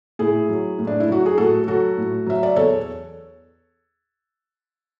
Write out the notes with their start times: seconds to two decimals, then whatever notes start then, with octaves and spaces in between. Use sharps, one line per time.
0.19 A2 E4 G#4
0.49 F#3
0.79 A2
0.87 D4
1.00 E4
1.09 F#3 F#4
1.26 G#4
1.38 A2 F#4 A4
1.67 F#3 F#4 A4
1.97 A2
2.26 F#3 E5
2.43 D5
2.56 E2 A4 C#5